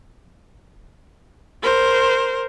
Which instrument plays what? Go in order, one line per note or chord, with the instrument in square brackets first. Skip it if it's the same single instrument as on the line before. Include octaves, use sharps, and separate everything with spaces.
[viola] A#4 C5